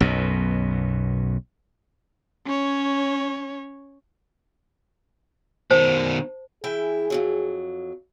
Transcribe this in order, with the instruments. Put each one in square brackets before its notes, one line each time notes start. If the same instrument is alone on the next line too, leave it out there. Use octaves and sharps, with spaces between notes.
[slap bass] B1 F#2 B2
[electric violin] C#4 C#5
[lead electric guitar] B2 D#3 [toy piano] C5 A5
[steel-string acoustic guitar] E3 E4 G5 [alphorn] G#4
[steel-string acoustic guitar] F2 G#2 F#3